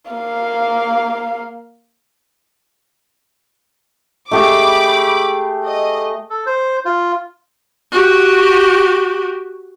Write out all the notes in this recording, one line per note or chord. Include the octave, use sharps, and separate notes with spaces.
A#3 F5
A3 G4 G#4 B5 D6
D#5
A4
C5
F4
F#4 G4